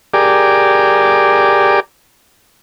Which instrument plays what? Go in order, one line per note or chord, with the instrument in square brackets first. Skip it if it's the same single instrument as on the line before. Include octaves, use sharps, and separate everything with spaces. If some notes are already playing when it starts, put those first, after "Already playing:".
[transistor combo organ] G4 G#4 A#4 D5